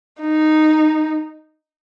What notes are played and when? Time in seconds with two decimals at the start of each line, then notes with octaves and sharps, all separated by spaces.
0.22 D#4